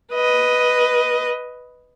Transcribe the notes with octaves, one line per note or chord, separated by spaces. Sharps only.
B4 D#5